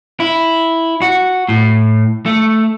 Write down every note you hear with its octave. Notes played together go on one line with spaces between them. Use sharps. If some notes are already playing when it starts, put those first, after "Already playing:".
E4
F#4
A2
A3